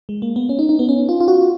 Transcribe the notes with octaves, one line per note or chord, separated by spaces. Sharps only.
G#3
A#3
B3
C#4
D#4
D#4
B3
C#4
F4
F4
F#4